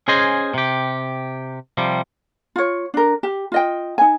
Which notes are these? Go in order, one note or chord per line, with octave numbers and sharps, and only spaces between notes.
C#4 G#4 C5 D#5 G#5
C3 G4
C3 F3 G3
F4 C#5
D4 A#4
G4
F4 D#5 G5
D#4 G#5